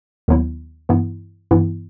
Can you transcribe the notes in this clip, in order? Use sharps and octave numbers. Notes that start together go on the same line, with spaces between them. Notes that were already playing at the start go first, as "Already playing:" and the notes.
D#2 D#3 F#3 B3 E4
G2 E3 B3 E4
G2 E3 B3 E4